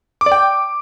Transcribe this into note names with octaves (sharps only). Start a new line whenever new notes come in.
D6
D5
G5